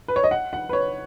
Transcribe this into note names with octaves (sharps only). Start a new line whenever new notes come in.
B4
C#5
D#5
F#5
F#5
B4
C#5